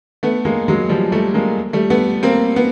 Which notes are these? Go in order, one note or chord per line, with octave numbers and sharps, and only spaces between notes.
A3 B3
G#3 A#3
F#3 G#3
F3 G3
G3 A3
G#3 A#3
G3 A3
A3 B3
A#3 C4
B3